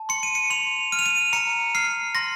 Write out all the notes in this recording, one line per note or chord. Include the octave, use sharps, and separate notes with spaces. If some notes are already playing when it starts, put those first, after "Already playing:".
Already playing: A5
C6 C#7
D#7
C#7
C6 F7
F6 D#7
F7
D#7
A#5 C#7
F6 C7
C6 A#6